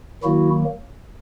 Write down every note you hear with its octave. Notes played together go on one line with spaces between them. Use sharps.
D#3 F#3 A#3 E4 F#4